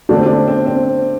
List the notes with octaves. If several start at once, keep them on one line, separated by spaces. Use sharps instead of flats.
D3 A3 D4
C4
D4
C4
C4